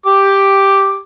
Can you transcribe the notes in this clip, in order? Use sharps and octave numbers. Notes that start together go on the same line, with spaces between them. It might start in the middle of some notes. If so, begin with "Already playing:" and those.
G4 D6